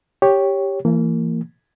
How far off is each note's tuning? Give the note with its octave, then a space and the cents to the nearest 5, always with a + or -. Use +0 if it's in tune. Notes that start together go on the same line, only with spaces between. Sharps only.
G4 +5 C#5 +0
E3 +30 A#3 -25